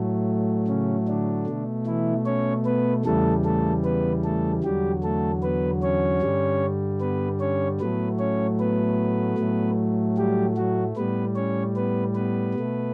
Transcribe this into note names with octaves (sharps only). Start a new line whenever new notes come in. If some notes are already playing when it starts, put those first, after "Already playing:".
Already playing: A2 F#3 A3
C#3 C#4
D3 D4
B2 A3
E3 E4
C#4 C#5
B3 B4
E2 C#3 E3 G3 A3 A4
A3 A4
B3 B4
A3 A4
E2 D3 F#3 G3 G4
A3 A4
B3 B4
C#4 C#5
G2 D3 G3
B3 B4
C#4 C#5
A2 F#3 A3 B3 B4
C#4 C#5
B3 B4
A2 F#3 A3
G3 G4
F#3 F#4
A2 G3 B3 B4
C#4 C#5
B3 B4
B3 B4
B2 A3